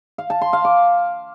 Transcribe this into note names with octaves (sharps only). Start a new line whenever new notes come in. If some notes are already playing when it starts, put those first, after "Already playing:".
F5
A5
C6
F5
D6